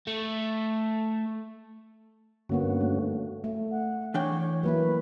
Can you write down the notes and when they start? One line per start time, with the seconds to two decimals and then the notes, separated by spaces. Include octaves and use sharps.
0.07 A3
2.49 G2 D3 A#3 B3 C#4 F#4
2.81 A3
3.44 A3
3.71 F#5
4.14 E3 D4 C#5 G5
4.63 F#3 A#3 E4 B4